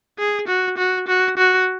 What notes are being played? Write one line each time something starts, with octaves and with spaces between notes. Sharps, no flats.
G#4
F#4
F#4
F#4
F#4